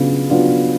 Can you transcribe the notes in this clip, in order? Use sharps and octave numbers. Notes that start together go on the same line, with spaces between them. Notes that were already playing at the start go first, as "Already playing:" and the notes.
Already playing: C#3 F#3 B3 D4 F4
F#3 B3 D4 F4